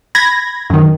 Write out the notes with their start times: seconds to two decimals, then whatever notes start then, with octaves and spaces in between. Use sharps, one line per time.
0.15 B5 G#6 A#6
0.70 F#2 D#3